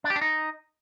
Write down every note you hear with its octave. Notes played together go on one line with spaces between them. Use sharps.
D4
G4
D4
D#4